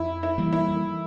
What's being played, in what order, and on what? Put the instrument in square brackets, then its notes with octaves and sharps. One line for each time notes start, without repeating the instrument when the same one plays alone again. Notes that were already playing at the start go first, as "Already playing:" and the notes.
Already playing: [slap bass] F2 [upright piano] E4
[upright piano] E4
[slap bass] E3 G3 A#3
[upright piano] E4